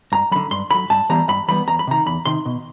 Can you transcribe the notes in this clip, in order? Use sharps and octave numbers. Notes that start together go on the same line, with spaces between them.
G2 A#5
D3 F#3 B5
G2 C6
D3 F#3 B5
G2 A5
E3 G3 B3 A#5
G2 B5
E3 G3 B3 B5
E2 A#5
B5
C3 D#3 A#5
E2 B5
C3 D#3 C6
B2